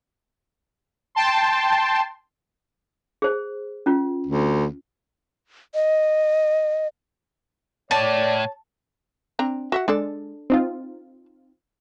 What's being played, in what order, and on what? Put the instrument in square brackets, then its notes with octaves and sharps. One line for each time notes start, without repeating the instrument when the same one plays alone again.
[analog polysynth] G5 A5 C6
[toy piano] G#4 C5
C#4 F4
[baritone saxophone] D2
[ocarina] D#5
[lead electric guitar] A2 [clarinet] C#5 [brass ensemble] D5 [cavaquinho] A5
[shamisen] C4 D4 A#5
F#4 E5 F#5
[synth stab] G#3 [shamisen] D4 A4 D5
[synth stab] C4 D#4 F4